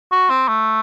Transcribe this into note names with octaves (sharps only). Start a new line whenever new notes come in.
F#4
C4
A3